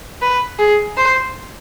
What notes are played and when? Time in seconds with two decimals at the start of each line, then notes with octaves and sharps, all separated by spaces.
0.22 B4
0.59 G#4
0.97 C5